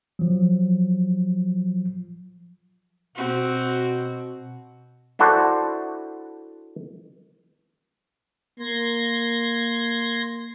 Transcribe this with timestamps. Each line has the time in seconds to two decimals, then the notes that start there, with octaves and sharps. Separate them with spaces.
0.19 F3 F#3
3.16 B2 C4 F#4
5.19 D4 E4 F#4 A4 C5
8.60 A#3 C6 G#6 A#6